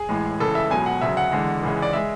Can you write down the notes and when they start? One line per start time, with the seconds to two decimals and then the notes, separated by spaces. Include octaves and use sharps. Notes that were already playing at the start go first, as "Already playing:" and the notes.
Already playing: G#4
0.09 A1 A2 G#3
0.40 C#2 C#3 E3 A4
0.55 E5
0.70 C#2 B2 F#3 G#5
0.86 F#5
1.01 D2 C#3 F#3 E5
1.17 F#5
1.32 E2 D3 G#3
1.63 C#2 C#3 E3 G#3
1.82 D5
1.93 G#3 E5